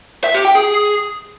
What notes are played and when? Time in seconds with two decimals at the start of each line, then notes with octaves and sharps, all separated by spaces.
0.24 E5
0.34 G4
0.45 G5
0.55 G#4